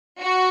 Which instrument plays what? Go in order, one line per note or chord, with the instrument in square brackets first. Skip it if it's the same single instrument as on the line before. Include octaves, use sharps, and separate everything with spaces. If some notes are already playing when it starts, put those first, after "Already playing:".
[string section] F#4